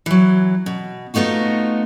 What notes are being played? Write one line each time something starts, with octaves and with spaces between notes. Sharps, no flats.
E3 F#3
B2
A3 B3 D#4 F4 F#4